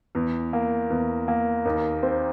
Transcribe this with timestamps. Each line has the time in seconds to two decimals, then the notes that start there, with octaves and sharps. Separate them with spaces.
0.15 E2
0.53 A#3
0.90 E2
1.28 A#3
1.65 D#2
2.03 C4